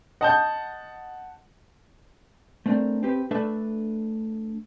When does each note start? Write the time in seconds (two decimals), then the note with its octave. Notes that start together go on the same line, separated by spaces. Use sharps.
0.21 D#5 F#5 A5 G6
2.66 A3 C4 D4 A#4
3.03 C4 G4 B4
3.31 A3 D4 A4 B4 E5